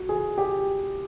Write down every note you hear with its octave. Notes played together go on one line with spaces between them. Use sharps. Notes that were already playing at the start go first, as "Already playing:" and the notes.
Already playing: F#4
G#4
G4